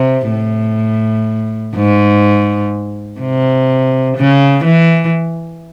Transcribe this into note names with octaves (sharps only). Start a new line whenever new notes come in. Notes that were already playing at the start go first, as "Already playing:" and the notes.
Already playing: C3
A2
G#2
C3
C#3
E3